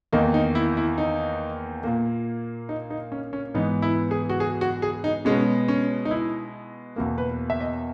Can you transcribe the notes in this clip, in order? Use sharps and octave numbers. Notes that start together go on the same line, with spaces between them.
E2 D#3 A#3 D#4
D#4
E4
E4
D#4
A#2 A#3
D#4
D#4
C#4
C#4
G#2 E3 B3 D#4
E4
G#4
F#4
G#4
F#4
G#4
D#4
B2 G#3 B3 C#4
C#4
D#4
E4
E2 B2 A#3
B4
E5
D#5